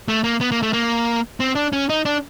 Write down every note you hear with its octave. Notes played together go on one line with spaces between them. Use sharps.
A3
A#3
B3
A#3
A3
A#3
C4
D4
C#4
D#4
D4